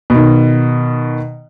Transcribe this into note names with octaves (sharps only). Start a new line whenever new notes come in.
B2 D#3